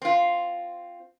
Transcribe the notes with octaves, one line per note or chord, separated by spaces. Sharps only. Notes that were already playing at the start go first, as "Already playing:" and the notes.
C4 F4